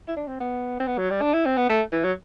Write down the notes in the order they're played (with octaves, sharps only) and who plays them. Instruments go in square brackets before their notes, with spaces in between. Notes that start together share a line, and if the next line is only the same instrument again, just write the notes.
[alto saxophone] E4
D4
C4
B3
C4
B3
F#3
G3
D4
E4
C4
B3
A3
E3
F#3